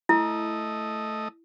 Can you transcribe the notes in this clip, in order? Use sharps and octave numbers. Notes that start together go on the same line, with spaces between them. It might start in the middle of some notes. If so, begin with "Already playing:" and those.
A3 E4 D#5